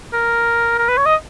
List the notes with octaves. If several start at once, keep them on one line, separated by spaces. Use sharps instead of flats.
A#4
A#4
B4
C#5
D#5